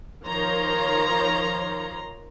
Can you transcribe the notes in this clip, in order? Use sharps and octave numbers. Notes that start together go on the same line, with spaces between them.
D#3 F3 C#5 A#5 C6